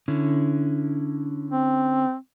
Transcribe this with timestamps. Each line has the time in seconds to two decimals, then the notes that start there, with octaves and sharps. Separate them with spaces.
0.08 D3 C#4 E4
1.51 C4